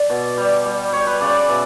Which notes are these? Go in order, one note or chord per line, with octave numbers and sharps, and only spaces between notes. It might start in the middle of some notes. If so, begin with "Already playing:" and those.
Already playing: D5
B2
G3
G3
G3 C#5
B4
C#3 D5
D5
B2 E5